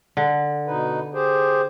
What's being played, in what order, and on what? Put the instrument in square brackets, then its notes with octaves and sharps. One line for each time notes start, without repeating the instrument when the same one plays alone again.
[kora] D3
[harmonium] B2 D#4 B4
G4 G#4 C5